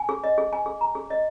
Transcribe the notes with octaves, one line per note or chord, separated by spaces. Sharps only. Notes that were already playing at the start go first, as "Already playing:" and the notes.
Already playing: G#5
G#4
D#5
G#4
G#5
G#4
A#5
G#4
D#5